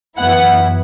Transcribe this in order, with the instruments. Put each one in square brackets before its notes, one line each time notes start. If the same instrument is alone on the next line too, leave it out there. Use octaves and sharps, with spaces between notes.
[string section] F#2 E3 B3 E4 F#5